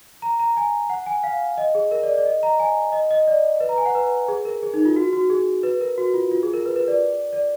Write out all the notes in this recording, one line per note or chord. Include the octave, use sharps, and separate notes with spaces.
A#5
A#5
G#5
F#5
G#5
F5
D#5
G#4
A#4
D5
D5
D#5
A#5
G#5
D#5
D#5
D5
B4
A#5
G#5
F#5
B4
G#4
A#4
G#4
D#4
F4
F#4
F#4
G#4
B4
A#4
F#4
F4
F4
G#4
A#4
B4
B4
D5
D5